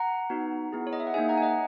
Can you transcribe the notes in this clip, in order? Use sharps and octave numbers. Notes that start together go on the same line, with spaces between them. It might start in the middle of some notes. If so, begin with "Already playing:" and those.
Already playing: F#5 A#5
B3 D#4 F#4
B3 E4 G#4
C#5
D#5
E5
F#5
A#3 D#4 G#4 E5 G#5
F#5 A#5
G#5
D#5 F#5